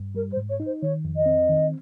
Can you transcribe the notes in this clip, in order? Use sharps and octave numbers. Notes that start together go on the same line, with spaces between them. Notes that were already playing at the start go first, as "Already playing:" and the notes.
Already playing: G2
G3 A#4
C5
G#2
C#5
D#4
C5
D#3 C#5
F2
D#5
C4
D#3